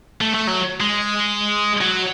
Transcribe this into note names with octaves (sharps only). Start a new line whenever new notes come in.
A3
A3
F#3
G#3
F#3